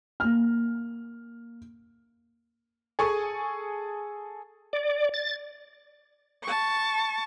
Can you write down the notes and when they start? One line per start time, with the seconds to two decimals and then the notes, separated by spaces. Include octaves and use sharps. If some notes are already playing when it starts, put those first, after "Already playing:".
0.20 A#3 F6
2.99 G#4 A4 G#5 A5 C#6
4.73 D5
5.14 A6
6.43 A5 C#6